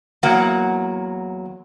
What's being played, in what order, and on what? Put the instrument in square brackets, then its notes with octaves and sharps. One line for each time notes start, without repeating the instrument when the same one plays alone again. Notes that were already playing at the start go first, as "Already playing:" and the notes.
[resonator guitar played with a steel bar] E2 F#3 A#3 F#5